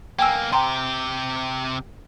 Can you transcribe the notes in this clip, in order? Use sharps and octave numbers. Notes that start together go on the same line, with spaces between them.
B1 A#3 G5 G#5 E6
C3 G4 G5 A#5 C6